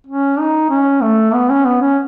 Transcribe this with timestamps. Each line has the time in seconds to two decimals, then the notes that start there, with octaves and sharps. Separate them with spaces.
0.07 C#4
0.40 D#4
0.70 C#4
1.02 A3
1.34 B3
1.50 C#4
1.65 B3
1.82 C#4